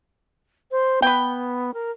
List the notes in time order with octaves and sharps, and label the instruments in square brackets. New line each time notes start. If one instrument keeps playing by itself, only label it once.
[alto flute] C5
[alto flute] B3 [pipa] B4 G5
[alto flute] A#4